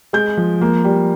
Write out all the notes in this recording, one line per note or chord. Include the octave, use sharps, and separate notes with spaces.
G#3 G6
F3
A#3
G3